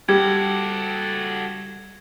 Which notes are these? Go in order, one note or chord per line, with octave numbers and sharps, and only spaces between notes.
G3 F#4 G4 A4 G#6